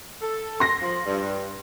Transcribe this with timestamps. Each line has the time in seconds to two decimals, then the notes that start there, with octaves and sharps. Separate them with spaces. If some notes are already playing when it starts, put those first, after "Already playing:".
0.22 A4
0.60 C6 A#6
0.80 F3
1.04 G2